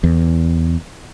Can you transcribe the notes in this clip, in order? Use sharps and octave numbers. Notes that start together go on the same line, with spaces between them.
E2